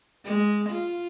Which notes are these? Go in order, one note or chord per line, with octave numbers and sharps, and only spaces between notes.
G#3
F4